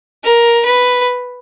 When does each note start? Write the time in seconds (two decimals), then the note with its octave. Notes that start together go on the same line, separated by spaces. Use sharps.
0.24 A#4
0.65 B4